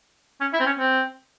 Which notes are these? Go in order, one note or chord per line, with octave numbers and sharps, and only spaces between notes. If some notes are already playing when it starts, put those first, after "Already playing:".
C#4
E4
C4
C#4
C4